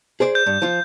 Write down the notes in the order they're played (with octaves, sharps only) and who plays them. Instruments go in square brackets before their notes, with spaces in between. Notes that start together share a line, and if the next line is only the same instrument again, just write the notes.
[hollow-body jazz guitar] G#4 C5 D5
[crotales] G6
[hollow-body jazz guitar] G2
F3 F4